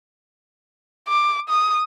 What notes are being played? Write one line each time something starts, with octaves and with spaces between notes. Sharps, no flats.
D6
D#6